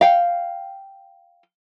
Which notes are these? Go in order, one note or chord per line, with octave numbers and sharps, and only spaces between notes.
F5 G5